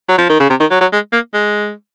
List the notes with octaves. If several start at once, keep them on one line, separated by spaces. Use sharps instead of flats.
F#3
F3
D#3
C#3
C3
D#3
F#3
F#3
G#3
A#3
G#3